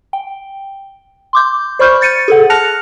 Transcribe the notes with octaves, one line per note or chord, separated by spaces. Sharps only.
G5
C6 D6 G6
C5 D5 B5 C#6 F6 G6
G6 A6 C#7 D#7
G#4 A4 F#5
A5 F6 F#6 A#6 C#7 F7